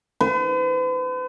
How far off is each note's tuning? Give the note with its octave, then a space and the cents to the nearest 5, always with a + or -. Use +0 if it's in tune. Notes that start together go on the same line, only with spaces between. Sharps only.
B4 +45